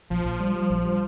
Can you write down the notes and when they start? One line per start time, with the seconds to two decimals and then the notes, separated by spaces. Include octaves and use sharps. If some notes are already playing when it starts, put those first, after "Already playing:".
0.10 A#1 F3
0.25 A#1
0.40 G3
0.55 G3
0.70 A#1
0.85 G3